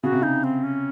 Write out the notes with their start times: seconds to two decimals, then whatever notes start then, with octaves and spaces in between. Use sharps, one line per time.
0.03 C#3 F#4
0.12 C3
0.22 C#3 D#4
0.44 C4
0.64 C#4